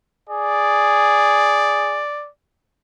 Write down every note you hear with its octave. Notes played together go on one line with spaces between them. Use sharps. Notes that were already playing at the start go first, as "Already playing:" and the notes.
G#4 D5